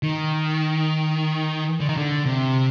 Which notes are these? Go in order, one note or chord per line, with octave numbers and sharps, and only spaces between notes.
D#3
D3
D#3
D3
C3